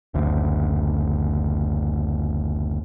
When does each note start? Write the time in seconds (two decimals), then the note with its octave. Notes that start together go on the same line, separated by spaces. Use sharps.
0.14 F#1 D2